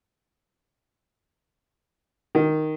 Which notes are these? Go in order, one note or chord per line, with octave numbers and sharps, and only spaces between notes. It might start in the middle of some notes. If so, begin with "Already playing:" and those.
D#3